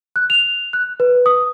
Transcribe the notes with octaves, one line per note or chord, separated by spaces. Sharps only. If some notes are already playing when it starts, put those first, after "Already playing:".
F#6
F7
F#6
B4
D#6